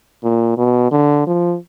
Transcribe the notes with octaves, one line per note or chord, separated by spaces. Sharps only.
A#2
B2
D3
F3